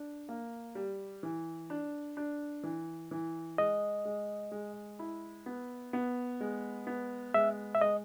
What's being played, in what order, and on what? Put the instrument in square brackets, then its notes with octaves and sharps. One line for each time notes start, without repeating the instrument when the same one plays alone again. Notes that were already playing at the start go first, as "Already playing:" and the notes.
Already playing: [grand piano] D4
A#3
G3
E3
D4
D4
E3
E3
[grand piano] G#3 [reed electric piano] D#5
[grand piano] G#3
G#3
E4
B3
B3
G#3
B3
[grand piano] G#3 [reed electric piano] E5
[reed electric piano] E5
[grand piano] G#3 [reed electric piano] D#5